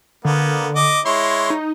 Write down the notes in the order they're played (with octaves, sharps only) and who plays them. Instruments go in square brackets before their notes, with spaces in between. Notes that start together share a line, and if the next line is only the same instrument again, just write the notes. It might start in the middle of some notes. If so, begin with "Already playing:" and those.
[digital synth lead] D3 [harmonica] A#3 B3
[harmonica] D#5 D6
[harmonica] G#3 E4 C#5 [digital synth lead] C6
[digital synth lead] D#4